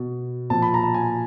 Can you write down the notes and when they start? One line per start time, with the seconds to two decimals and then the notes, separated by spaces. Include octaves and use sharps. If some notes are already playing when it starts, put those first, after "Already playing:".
Already playing: B2
0.50 A#2 F3 A5
0.62 B5
0.74 A#5
0.83 A5
0.94 G#5